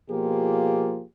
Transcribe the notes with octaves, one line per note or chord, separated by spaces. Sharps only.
B2 F3 A#3 F4 G4 G#4